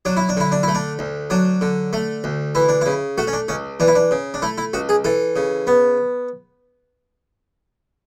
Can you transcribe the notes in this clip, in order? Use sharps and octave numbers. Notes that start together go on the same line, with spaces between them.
F#3 D4
E4
D4
D3 E4
D4
A3 E4
D4
D2
F#3 D4
D3
A3
D2
E3 E4
D4
C#3 E4
A3 F#4
C#4
D4
C#2 C#4
E3 D4
E4
D4
C#3
D4
A3 E4
E4
C#2 F#4
G#4
E3 A4
C#3
B3